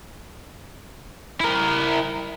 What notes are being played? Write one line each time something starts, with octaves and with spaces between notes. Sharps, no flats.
E4 A#4